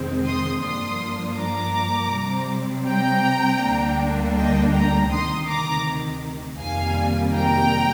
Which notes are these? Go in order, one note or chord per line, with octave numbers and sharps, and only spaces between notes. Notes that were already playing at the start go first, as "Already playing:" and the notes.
Already playing: F2 C3 D#3 G#3 C4
C6 D#6
G2 F3 A#3 D4 C6 D#6
A#5 D6
C3 G3 C4
G5 A#5
D2 D3 G3 A#3 D4
D#5 G5
G5 A#5
D2 C3 D#3 C6 D#6
A#5 D6
F2 C3 D#3 G3 A#3 F5 G#5
G5 A#5